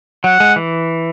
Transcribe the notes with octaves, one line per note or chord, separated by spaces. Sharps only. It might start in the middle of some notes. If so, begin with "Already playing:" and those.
F#3 F#5
G#3
E3